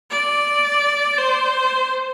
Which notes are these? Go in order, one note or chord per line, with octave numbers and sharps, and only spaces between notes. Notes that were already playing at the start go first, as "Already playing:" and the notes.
D5
C5